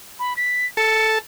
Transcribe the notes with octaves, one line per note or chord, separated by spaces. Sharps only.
B5
B6
A4 C#7